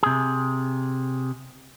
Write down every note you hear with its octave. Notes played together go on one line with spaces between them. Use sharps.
C3 G#4